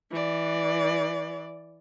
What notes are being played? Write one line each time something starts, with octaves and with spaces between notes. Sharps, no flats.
E3 D5